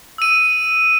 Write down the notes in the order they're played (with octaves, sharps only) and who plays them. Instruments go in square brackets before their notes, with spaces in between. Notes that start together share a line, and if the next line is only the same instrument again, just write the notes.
[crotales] E6 D#7